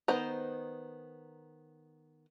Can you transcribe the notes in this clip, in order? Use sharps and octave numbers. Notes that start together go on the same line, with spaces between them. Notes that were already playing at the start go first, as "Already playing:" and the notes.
D#3 B3 C5 D#5 A#5